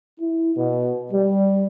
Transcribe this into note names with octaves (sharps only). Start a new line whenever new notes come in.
E4
B2
G3